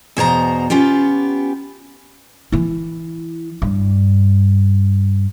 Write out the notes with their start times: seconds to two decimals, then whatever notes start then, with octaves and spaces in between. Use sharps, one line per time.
0.17 E2 B2 C5 A#5
0.70 B3 C#4 F4 G4
2.52 E3 E4
3.62 G2